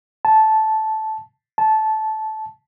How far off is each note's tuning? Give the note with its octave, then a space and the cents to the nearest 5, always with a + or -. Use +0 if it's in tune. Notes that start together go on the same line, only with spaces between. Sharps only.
A5 -10
A5 -15